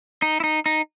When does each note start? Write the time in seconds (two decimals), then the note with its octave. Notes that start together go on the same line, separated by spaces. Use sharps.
0.22 D#4
0.40 E4
0.44 D#4
0.66 D#4